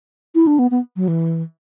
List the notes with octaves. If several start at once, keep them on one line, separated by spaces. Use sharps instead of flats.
E4
D4
B3
B3
F#3
E3